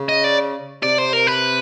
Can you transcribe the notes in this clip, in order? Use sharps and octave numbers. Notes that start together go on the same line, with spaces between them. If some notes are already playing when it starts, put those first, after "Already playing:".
Already playing: C#3
D#5
D5
C3 D5
C5
A#4
B4